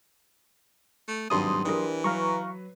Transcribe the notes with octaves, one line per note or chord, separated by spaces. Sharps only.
A3
D#1 G#1 G2 F#3 C6 D#6
E3 D4 G4 A#4
F#3 B4 F5 A#5 C#6